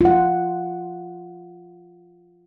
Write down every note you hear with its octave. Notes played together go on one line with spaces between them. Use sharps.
F4 F#5